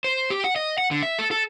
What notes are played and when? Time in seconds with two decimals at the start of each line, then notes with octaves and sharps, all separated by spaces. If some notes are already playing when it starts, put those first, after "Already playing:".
0.04 C5
0.30 G4
0.44 F#5
0.56 D#5
0.78 F#5
0.91 D3
1.03 E5
1.19 A4
1.31 A4